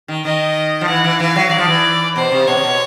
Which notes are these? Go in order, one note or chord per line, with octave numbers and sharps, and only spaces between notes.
D#3
D#3 D#5
F3
E3 F#5
E3
E3 F5
F#3
F#3 D5
F3
E3
B2 C5
C3
B2 C#5
C3
B2